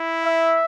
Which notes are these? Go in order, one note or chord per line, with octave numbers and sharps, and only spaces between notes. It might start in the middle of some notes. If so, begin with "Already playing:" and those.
Already playing: E4
E5